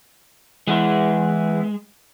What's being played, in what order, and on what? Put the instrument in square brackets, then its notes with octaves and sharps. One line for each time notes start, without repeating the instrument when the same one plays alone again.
[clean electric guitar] E3 B3 E4 [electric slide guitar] G#3